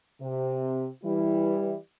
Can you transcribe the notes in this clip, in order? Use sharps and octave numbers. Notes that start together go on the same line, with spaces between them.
C3
E3 G3 E4